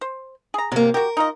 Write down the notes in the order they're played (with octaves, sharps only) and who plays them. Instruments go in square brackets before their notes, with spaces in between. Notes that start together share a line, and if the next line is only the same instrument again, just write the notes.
[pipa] C5
G#4 A#5
[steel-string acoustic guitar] C3 A#3 [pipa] F#3
[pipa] F#4 G4 [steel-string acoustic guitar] A#4
[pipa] D#4 F4 D#5